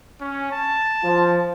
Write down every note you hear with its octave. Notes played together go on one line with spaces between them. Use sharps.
C#4
A5
F3 F4